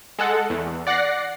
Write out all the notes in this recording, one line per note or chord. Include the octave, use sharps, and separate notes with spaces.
G#3 A4 F#5
E2
D5 F#5 F#6 A#6 C7